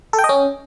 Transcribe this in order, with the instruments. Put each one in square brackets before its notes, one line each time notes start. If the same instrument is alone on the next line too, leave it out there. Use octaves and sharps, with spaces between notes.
[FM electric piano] A4
G5
D#5
C#4